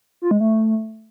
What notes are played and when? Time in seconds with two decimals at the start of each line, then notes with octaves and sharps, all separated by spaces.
0.22 F4
0.31 G#3
0.40 A3